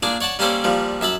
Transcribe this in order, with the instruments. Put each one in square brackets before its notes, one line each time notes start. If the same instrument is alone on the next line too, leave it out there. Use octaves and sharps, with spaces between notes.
[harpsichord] A#2 D4 G#4 D5
C#5 D5 F#5 A5
G3 A#3 C#4 A4 C5 D5
A#2 F3 G3
F#2 E5 A5 B5